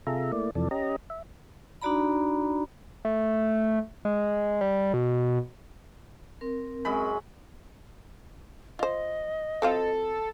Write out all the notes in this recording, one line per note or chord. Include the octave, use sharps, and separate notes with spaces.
C3 F4 G#4 A4 E5 A#5
A3 A#3 E4 D5
F2 C3 E3 F3 A4 D5
C#4 G4 D#5 A#5
E5
D4 D#4 F#4 D5 A#5 B5
A3
G#3
G3
B2
C4 A#4
F#2 G#3 B5
F4 C5 D#5
F#3 C4 F4 A4